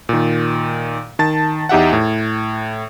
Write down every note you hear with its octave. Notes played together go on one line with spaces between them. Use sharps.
A#2 D#3
D#3 A5 A6
E2 D#4 G4 E5 F#5
A2